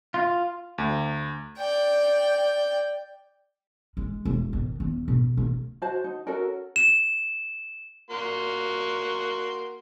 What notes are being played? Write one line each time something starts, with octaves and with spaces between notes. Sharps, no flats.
F4
D2
D5 G5
G#3
E1
D#3
E2
B2
A#3
F#4 C5 A5
D#4
C#4 F#4 A4 A#4
E7
A#3 F#4 C6